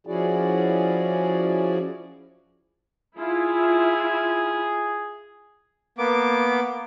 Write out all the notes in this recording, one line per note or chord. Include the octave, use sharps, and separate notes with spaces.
F3 C#4 E4 F#4 G#4 D5
E4 F4 G#4
A#3 B3 D6